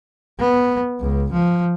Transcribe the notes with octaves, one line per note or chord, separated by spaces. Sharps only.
B3
C#2
F3